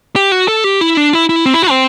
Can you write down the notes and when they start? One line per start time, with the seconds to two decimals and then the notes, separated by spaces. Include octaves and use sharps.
0.16 G4
0.32 F#4
0.48 A4
0.64 G4
0.81 E4
0.97 D4
1.13 E4
1.29 E4
1.46 C4
1.54 E4
1.63 F#4
1.70 C4